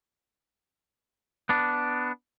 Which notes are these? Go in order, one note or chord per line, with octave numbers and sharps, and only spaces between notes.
B3 D4